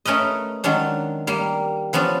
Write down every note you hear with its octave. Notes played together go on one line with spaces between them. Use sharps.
A3 C#4 A#4 B4 D#5
D#3 F#3 G#3 C#4 D4
G3 A#3
F3 B3 C#4 D4